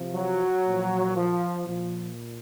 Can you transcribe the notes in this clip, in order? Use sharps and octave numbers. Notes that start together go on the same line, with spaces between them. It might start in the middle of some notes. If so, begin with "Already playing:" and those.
Already playing: C3 F3
F#3
A#2 F3
F3
A#2 F3